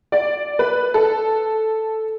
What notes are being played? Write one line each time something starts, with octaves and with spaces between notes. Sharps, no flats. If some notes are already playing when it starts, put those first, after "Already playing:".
D5
B4
A4